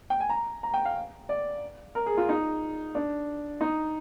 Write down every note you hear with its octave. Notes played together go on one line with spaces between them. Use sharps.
G5
G#5
A#5
A#5
G5
F5
D5
A#4
G#4
F4
D#4
D4
D#4